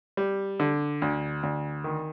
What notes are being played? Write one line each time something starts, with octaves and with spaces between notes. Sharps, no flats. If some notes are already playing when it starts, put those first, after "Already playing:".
G3
D3
D2
D2
D#3